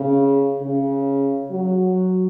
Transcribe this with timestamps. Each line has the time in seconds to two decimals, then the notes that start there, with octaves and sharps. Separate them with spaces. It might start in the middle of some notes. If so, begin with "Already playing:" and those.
Already playing: C#3
0.61 C#3
1.51 F#3